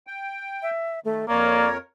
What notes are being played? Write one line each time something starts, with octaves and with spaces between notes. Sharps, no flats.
G5
E5
D#3 A3
F2 A#3 A#4 C#5 D5